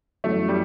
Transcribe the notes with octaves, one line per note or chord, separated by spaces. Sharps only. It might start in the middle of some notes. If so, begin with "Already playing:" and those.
F#2 E3 A3 B3 F#4
G3